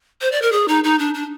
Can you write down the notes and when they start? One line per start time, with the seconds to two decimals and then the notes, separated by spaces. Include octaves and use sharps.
0.21 C5
0.32 D5
0.42 A#4
0.52 G#4
0.68 D#4
0.84 D#4
0.99 D4
1.14 D4